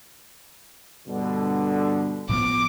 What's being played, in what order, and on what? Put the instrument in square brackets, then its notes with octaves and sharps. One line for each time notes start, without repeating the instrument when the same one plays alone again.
[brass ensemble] G2 B2 D3
[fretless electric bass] A2 F3 B3 [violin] D6